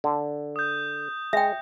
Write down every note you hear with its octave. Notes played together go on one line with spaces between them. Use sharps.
D3
D#6 G6
G#3 E5 G5